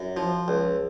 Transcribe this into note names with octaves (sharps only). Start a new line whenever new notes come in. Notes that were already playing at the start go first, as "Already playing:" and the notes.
Already playing: F#2
F3
C#2